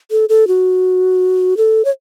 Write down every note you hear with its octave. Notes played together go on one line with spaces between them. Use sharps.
A4
A4
F#4
A4
C#5